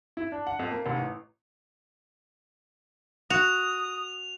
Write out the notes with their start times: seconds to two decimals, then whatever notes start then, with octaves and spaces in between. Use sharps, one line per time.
0.17 E4
0.32 D4
0.47 F#5
0.59 F2
0.71 A#3
0.86 F1
0.98 A1
3.30 F#4 D#6 F7